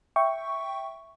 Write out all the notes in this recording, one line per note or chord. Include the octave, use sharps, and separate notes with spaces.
E5 G5 C#6